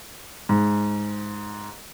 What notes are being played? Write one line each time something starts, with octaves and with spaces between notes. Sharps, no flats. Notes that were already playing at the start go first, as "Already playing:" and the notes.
G#2